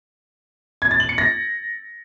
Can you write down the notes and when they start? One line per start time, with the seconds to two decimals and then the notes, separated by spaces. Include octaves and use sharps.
0.82 G#6
0.91 A6
1.00 F#7
1.09 C#7
1.18 A#6